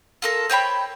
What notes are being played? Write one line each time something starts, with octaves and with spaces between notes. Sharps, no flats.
F4 A4 A#4
C5 C#5 G5 B5